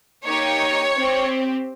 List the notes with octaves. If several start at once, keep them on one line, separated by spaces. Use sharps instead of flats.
A#3 D#4 G4 C#5
C4 G4